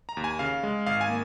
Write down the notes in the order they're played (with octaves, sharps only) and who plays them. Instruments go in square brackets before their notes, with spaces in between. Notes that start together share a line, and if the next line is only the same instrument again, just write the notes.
[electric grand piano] A#5
D#2
G#5
C#3 F5
G#3
G#1 F5
G#5
A#3